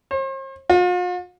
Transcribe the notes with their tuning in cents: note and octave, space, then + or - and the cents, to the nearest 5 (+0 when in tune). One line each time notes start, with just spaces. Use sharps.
C5 +45
F4 +45